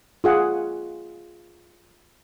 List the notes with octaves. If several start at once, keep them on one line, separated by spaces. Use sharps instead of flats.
F4 G#4 F#5